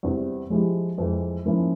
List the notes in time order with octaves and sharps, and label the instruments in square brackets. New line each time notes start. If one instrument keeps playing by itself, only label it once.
[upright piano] E2 C3 G3 C4
F3 G#3 E4 G4
F2 E3 G#3
G#2 F3 A#3 C#4 E4